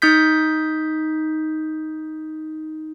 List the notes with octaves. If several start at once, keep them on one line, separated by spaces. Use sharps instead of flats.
D#4 D#6 G6 B6